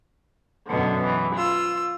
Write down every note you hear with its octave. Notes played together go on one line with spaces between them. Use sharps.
F#2 B2 D3
E3
F4 E6